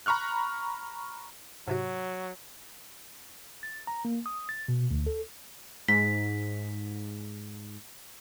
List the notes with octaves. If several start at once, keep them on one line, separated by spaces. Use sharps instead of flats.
A#5 B5 C#6 F6 F#6
G#2 C3 F#3 F#4
A6
A#5
A#3
D#6
A6
B2
D2
A4
G#2 B6